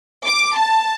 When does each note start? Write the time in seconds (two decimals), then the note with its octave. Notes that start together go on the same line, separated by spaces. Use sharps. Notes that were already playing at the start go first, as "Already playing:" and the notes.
0.25 D6
0.56 A5